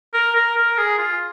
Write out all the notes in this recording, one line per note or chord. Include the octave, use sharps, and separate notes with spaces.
A#4
A#4
A#4
G#4
F4